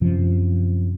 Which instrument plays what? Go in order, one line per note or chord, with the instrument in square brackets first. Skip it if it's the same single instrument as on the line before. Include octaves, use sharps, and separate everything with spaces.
[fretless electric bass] F#2 C3 F3